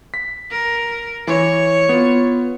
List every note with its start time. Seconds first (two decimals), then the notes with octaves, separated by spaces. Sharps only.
0.14 B6
0.51 A#4
1.27 E3 C#5
1.89 B3 F4